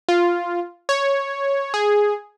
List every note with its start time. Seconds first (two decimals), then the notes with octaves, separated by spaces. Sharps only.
0.08 F4
0.89 C#5
1.74 G#4